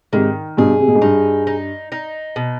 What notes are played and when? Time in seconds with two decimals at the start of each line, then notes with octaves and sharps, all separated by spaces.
0.13 G#2 C3 D#3
0.57 G2 B2 G#4
0.80 C3
0.88 B2
0.95 G#2
1.02 G2 D#4
1.47 D#4
1.92 D#4
2.36 B2